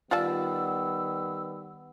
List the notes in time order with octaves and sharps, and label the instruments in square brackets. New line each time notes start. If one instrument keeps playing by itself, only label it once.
[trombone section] D#3 G3 B3 [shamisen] F4 D5 A5 [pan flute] E6